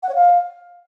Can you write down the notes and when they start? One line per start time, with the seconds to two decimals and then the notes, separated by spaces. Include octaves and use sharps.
0.03 F#5
0.09 C#5
0.15 F5